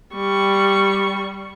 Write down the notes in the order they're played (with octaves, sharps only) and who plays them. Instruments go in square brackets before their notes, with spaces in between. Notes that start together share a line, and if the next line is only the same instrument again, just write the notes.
[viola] G3 C#6